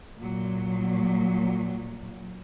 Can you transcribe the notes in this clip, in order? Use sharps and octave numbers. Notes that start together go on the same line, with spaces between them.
A#2 F#3